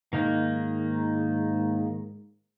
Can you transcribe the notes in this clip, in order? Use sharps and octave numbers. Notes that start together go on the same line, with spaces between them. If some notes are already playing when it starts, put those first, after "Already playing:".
G#2 D#3 A#3 D#4